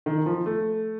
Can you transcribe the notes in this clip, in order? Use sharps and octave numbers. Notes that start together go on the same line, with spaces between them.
D#3
F3
A3